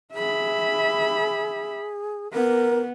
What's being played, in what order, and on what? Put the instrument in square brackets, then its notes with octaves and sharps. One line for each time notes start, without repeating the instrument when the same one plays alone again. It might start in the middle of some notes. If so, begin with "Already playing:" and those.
[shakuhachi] G#4 [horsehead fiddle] E5 B5
[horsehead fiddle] B3 [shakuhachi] A#4